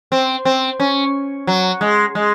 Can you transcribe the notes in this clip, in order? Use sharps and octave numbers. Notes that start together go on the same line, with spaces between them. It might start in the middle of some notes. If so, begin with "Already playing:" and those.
C4
C4
C#4
F#3
G#3
G#3